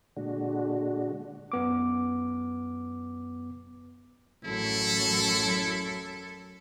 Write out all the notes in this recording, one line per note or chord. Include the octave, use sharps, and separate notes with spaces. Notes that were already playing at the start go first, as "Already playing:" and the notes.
A#2 D3 G#3 D4 F#4
F#2 B3 D6
A1 F#2 F#3 E4 A4